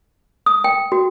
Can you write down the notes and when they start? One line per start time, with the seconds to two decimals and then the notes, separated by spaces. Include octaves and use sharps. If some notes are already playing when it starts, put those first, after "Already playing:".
0.46 D#6
0.64 G5
0.92 F#4